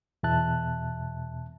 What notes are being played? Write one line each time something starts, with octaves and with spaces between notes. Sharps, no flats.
E2 B2 E5 A5 F#6